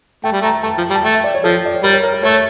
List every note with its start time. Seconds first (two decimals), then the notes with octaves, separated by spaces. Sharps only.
0.24 A3 G5
0.32 G3
0.41 A3 A#5
0.63 A3 A5
0.78 F3
0.90 G3
0.95 A5
1.04 A3 G5
1.14 E5
1.24 D5
1.34 C#5
1.44 F3 A4
1.66 D5
1.74 C#5
1.83 G3 A#4
1.93 C#5
2.03 A#4
2.13 A#4
2.23 A3 C#5